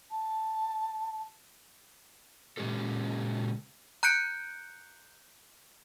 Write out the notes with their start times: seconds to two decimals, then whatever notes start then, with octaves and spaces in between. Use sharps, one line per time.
0.11 A5
2.57 A#2 C#3 G#3 C#4 G4 A4
4.03 A#5 F#6 G6 C#7 D7